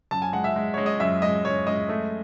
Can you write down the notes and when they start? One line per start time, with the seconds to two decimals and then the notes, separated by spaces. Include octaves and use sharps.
0.11 F#2 A5
0.22 G#5
0.33 G#3 F#5
0.44 E5
0.56 G#3
0.74 G#3 C#5
0.86 D#5
1.00 F#2 E5
1.22 G#3 D#5
1.45 F#2 C#5
1.67 G#3 D#5
1.89 A3